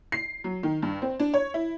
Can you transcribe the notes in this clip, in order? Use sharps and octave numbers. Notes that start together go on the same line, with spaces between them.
C7
F#3
D#3
G2
C4
D4
C#5
E4